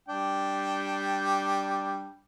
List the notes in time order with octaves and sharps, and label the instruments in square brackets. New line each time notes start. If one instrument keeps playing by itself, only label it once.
[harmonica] G3 D4 G5